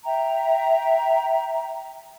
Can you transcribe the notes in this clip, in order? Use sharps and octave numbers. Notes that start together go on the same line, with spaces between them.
E5 G5 A#5